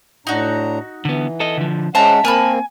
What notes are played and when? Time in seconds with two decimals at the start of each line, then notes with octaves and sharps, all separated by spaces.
0.27 A2 D4 D#4 F#4 A#5
1.05 D3 E3 B3
1.40 A4 D#5
1.58 D3 F3
1.95 G#3 C#4 C5 E5 F#5 A5 A#5
2.25 A#3 C4 A#4 G#5 A5 B5